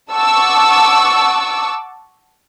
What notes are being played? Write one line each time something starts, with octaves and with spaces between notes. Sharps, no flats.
F#5 A5 C#6 D6 E6